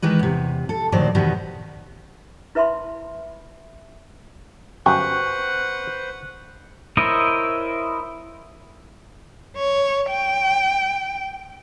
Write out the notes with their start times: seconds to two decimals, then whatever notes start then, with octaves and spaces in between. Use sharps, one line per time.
0.02 D#3 E3 G#3 B4
0.19 E2 C3
0.69 A4
0.92 D2 A#2 D#3 F#3 C5 D5
1.15 E2 B2 D#3 G3 B3
2.55 E4 B4 E5 A5 B5 C6
4.86 G1 F#2 B4 C5 F#5 G5 C#6
6.97 E4 A#4 C5 C#5 D#5
9.57 C#5
10.10 G5